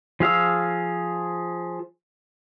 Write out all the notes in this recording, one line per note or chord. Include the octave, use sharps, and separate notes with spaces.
F3 G#4 F5 E6